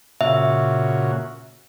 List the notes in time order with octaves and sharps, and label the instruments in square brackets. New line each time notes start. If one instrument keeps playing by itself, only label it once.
[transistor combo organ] A#2 C#3 F#4 [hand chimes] E5